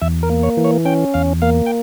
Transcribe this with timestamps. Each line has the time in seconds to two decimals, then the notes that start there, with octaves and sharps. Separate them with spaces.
0.02 E2 E5
0.23 A#4
0.30 A#3
0.43 C#5
0.57 E3
0.64 C#5
0.85 C#4 G5
1.14 E2 F5
1.42 A#3 F5
1.66 G5